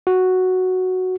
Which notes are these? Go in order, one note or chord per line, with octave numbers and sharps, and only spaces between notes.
F#4